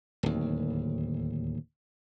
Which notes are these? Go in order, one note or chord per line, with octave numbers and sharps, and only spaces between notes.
D1 D#2